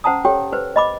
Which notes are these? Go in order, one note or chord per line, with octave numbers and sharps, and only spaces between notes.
C#4 C5 F#5 A5 A#5 D#6
G4 A4 C#5 G5
B4 C5
D#5 B5 D6